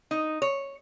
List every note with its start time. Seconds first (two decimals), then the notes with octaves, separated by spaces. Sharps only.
0.11 D#4
0.42 C#5